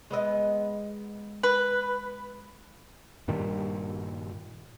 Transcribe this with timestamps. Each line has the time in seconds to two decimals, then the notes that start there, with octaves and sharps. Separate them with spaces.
0.10 G#3 B3 D#5
1.43 B4
3.28 G2 A#2 D#3 G3